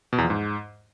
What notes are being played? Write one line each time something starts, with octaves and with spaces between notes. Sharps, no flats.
B2
E2
F3
G#2